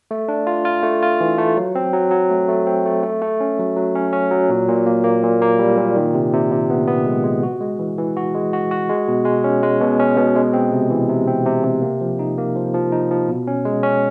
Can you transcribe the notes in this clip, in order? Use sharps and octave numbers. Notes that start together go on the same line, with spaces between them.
A3
D4
F4
F4
A3
F4
E3
A3
F#3
C4
F#3
F#3
A3
A3
C4
A3
A3
A3
C#4
F#3
F#3
C#4
C#4
F#3
A#2
A#2
A#3
A#3
A#2
A#3
G3
A#2
D#3
C3
C3
C3
B3
B3
G#3
G#3
F#4
G#3
E3
E3
F#4
G#3
F#4
F#4
G#3
B2
G#3
C#4
G#3
B2
C#4
B2
G#3
C4
C3
E3
C3
C4
C3
C3
A#3
F3
D#4
A#3
F3
F3
D#4
F3
B2
C#4
G#3
C#4